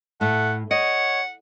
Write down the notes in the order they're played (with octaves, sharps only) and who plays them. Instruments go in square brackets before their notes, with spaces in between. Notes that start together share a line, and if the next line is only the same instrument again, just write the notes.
[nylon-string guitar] A2 [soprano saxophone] A3 [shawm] F#5
[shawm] C#5 [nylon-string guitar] D#5 [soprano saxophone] F#5